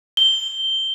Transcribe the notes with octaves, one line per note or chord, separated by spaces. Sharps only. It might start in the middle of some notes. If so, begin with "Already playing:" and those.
G7